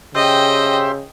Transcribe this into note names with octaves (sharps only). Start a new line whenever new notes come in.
C#3 G4 C5 D#5 E5 G5